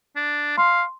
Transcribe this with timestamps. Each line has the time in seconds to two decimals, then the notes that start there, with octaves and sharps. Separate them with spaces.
0.16 D4
0.58 F5 C6